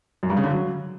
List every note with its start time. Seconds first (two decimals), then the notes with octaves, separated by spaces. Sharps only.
0.23 F#2
0.30 G2
0.37 C#3
0.44 D3
0.51 F#3